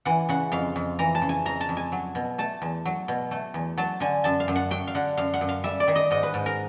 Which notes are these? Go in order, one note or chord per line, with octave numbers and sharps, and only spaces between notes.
E3 F#5
C#3 F#5
F2 F5
F2
E3 A#5
A5
C#3
G#5
F2 A#5
A5
F2
G#5
F#3
B2
A3 A5
E2
F#3
B2
A3
E2
F#3 A5
D3 G#5
F#2 A5
F5
F#2
F#5
F#3 G5
F5
D3 F#5
F#2 F5
F#5
F#2
F5
G3 E5
D5
D#3
D#5
G#2 D#5
B4
G#2
A#4